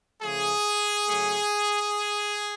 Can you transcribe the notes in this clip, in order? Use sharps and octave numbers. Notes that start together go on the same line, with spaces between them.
C#3 F3 A3 G#4
C#3 F#3 A3